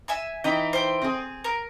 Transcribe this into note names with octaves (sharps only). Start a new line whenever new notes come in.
E5 G#5 E6
E3 D#4 E4 G5
C5 G5
C4 G#4
A#4